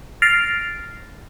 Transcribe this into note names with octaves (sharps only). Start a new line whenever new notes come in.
F6 A6 A#6 C7 D7 F7